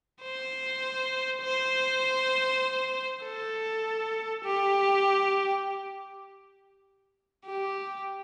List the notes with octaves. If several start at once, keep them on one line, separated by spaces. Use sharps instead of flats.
C5
C5
A4
G4
G4